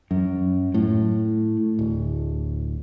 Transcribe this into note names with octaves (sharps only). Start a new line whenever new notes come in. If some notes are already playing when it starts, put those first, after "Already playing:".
F#2
A2
D1